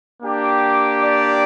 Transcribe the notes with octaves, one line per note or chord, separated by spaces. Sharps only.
A#3 D4 G4
D5